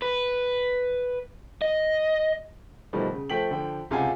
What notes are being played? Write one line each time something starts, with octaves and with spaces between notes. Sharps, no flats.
B4
D#5
B2 D#3 F3 G3 A3
C#3
F3 A3 A4 G5 B6 F#7
D3 F3 G5
C#2 C3 F4 G4 F#5 G#5